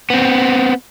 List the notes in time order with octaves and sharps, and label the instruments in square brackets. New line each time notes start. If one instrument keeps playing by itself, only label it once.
[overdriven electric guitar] B3 C4